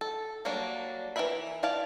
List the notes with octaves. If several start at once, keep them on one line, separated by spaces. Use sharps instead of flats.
A4
F#3 G3 A#3 D4
E3 D4 A#4 E5 B5
E4 D5 F5 A5